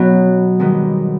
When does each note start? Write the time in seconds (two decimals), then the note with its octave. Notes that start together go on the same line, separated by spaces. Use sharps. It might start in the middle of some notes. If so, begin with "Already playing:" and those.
Already playing: B2 F#3 B3 C#4
0.59 G#2 D#3 G3 B3